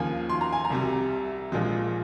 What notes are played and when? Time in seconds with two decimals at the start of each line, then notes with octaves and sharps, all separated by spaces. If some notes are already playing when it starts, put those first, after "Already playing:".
Already playing: D#2 C#3 F3 A#3 G#5
0.30 C6
0.41 A#5
0.53 G#5
0.65 A#5
0.70 C2 C3 G3
1.52 A#1 A#2 F3 G#3